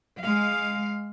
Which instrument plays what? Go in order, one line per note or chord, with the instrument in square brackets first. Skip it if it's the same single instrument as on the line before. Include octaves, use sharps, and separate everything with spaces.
[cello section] G#3 F5